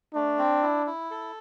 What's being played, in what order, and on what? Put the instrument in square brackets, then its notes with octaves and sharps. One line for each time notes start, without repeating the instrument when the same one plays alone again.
[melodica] A3 [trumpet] D4
[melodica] C4
E4
E4
A4